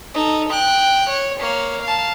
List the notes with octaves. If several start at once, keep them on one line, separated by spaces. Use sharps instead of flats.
D#4 A4
G5 F#6
C#5
A#3 C#5
F5 A5